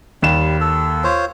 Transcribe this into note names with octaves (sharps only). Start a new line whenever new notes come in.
D#2 G3 E7
A4
F4 C5 C#5